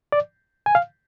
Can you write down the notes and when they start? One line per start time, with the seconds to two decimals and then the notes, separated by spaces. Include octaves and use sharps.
0.12 D5
0.66 G#5
0.75 F5